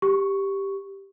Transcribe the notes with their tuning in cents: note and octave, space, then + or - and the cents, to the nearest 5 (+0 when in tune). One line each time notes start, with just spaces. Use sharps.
G4 +0 C#6 +0